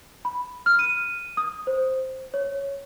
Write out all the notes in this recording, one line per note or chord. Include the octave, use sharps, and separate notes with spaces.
B5
F6
D#7
D#6
C5
C#5